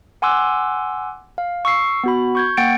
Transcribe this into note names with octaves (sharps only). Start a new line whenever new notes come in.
F#5 G#5 C6 D6 E6 F#6
F5
C#6 E6 C7
B3 F#4 B5
C#6 G6 G#6
A#3 F#5 G5 A6 C#7 D7